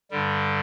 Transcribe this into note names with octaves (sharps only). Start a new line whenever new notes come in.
G2 D3 G3